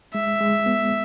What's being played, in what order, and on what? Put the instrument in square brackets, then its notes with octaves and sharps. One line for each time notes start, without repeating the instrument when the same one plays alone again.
[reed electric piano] G#3 [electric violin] E5
[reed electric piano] G#3
B3